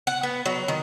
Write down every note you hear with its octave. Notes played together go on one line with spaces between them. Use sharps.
F#5
B3
F#3
D#3